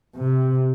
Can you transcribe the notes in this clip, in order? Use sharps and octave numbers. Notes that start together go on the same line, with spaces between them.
C3